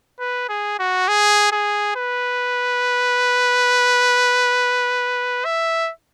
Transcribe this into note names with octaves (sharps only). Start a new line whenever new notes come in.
B4
G#4
F#4
G#4
G#4
B4
E5